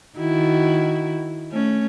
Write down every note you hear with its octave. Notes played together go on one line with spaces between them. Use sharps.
D#3 E4 F#4
A3 C#4